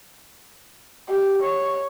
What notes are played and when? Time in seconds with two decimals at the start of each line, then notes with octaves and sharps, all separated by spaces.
1.09 G4
1.42 C#5